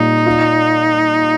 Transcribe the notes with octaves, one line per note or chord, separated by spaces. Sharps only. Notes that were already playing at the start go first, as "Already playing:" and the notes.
Already playing: A#2 G3 D#4
F4